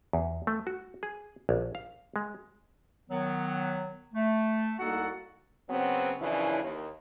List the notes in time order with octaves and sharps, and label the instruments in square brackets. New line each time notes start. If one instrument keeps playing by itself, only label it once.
[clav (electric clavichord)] E2
A3
F#4
G#4
A#1
F5
G#3
[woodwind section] D#3 F#3 B3
A3
C2 A#3 D#4 F#4 A4 F#5
[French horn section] C#3 F#3 B3 C4
F#2 C#3 E3 F3 D4 E4
D#2